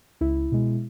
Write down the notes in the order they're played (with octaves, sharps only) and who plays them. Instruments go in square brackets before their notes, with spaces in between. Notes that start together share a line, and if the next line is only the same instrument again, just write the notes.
[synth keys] C#2 E4
B2 G#3